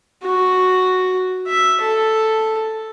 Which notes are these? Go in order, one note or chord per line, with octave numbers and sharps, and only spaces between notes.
F#4
E5
A4